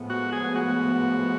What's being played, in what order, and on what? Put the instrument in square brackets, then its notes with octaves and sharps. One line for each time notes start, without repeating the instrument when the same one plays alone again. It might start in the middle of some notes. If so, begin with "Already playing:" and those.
Already playing: [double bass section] A2 F3 G#3 B3
[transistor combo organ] F#4
G#4
F#4